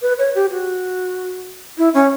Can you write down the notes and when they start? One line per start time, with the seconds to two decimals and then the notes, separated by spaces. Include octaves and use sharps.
0.02 B4
0.19 C#5
0.35 G4
0.51 F#4
1.78 E4
1.94 C#4